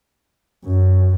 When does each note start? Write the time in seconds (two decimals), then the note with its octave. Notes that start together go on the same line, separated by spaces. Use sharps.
0.65 F#2